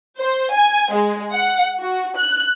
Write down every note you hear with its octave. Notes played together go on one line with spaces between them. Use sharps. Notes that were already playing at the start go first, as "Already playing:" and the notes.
C5
G#5
G#3
F#5
F#4
F#6